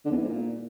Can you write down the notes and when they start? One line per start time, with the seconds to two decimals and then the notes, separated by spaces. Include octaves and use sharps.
0.05 D3
0.11 E2
0.17 E3
0.23 G#2
0.28 A#2